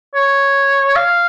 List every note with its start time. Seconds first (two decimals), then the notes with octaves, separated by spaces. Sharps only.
0.15 C#5
0.96 F5